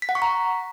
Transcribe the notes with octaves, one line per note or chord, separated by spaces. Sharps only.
B6
F#5
C#6
A#5